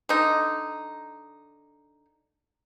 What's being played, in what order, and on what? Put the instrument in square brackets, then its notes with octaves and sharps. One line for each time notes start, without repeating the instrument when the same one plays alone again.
[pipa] D3 D#4